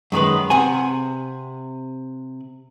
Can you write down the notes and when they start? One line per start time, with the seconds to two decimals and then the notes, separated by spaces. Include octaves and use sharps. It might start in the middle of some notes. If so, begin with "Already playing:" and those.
0.12 F#2 D#3 G#3 B4
0.50 C3 F#5 G#5